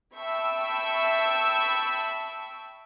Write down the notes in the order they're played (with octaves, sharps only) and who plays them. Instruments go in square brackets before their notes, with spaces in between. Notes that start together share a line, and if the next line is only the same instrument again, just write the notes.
[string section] E5 G5 A5 B5 C#6 E6